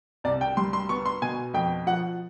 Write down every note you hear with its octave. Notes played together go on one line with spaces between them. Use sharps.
C2 D5
G5
G3 C6
C6
B3 C#6
C6
B2 G#5
F2 G5
F3 F#5